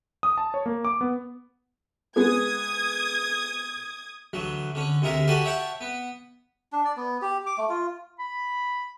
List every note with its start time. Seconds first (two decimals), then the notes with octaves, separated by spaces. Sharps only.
0.23 D#6
0.38 A5
0.54 C#5
0.66 A#3
0.85 D6
1.01 B3
2.16 G#3 B3 G#4 D#6 G#6
4.33 D2 E3 F#3
4.75 D3 C#4
5.02 D2 C3 E4 A#4 E5
5.27 F#4 G4 A4 D5 G#5 A5
5.45 C#5 E5 F#5 G5 A5
5.81 B3
6.72 D4
6.85 D5
6.97 B3
7.22 G4
7.46 D6
7.58 A3
7.69 F4
8.19 B5